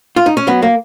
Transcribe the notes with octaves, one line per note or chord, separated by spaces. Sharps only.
F4
D#4
C#4
F#3 B3
A#3